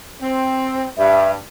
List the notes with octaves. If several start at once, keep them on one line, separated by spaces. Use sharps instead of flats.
C4
G2 E5